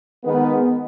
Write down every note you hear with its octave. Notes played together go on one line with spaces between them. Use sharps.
D#3 G#3 B3